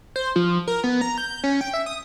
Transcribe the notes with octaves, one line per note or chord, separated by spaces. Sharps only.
C5
F3
A#4
B3
A#5
G6
C#4
G5
E5
D#6